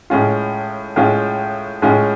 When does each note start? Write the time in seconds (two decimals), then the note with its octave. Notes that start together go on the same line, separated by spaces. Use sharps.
0.10 A2 G#3 C#4 F4
0.96 A2 G#3 C#4 F4
1.82 A2 G#3 C#4 F4